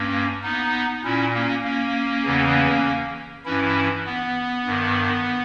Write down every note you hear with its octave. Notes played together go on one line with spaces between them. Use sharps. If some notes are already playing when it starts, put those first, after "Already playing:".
Already playing: G2 A#3 C#4
B3 D#4
A#2 C#4 E4
A#3 C#4
A#3 C#4
E2 C#3 E3
G2 E3 C#4 E4
B3
G2 D#3